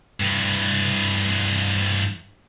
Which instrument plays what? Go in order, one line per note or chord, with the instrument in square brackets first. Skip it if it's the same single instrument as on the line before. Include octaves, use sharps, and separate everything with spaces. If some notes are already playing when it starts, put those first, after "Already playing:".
[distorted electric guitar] G2 E3